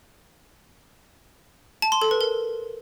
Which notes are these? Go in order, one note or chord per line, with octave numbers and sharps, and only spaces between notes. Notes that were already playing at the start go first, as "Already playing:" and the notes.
A5
C6
A4
B4
A#4